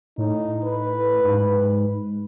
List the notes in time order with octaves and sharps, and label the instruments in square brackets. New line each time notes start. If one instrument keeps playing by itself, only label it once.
[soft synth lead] A2 [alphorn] D#4
[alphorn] B4
[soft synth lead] G#2